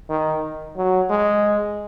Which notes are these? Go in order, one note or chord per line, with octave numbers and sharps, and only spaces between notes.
D#3
F#3
G#3